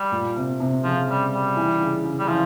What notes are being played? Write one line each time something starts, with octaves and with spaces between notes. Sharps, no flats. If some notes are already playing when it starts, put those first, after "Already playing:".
Already playing: G3
A#2
C3
C3
C#3 F3
G3
G3
E3
C#3
C#3
G3
E3 F3